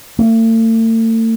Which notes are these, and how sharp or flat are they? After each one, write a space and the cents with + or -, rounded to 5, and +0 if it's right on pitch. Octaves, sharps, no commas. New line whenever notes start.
A3 +40